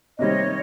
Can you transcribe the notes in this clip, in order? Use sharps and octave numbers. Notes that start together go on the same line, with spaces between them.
C3 D#3 G3 C4 C#5 D#5